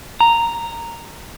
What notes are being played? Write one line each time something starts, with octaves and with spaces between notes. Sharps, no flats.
A#5